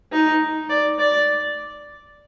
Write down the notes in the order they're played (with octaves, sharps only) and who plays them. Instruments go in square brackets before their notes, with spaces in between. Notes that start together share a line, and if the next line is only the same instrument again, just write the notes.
[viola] D#4
D5
D5